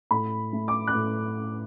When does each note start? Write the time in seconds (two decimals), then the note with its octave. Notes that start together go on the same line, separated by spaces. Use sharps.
0.11 A2 B5
0.53 A3
0.68 D6
0.87 F#6
0.95 A2